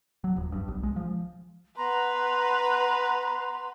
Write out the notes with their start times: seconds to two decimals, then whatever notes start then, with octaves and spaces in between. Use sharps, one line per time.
0.24 F#3
0.36 D#1
0.52 G2
0.68 B1
0.83 G#3
0.96 F3
1.77 B3 B4 A#5 C6